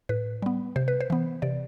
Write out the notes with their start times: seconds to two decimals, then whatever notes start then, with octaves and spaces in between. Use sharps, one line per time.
0.09 A2 B4
0.42 G3 B3
0.76 C3 C5
0.88 B4
1.01 C5
1.10 E3 B3
1.42 C3 D5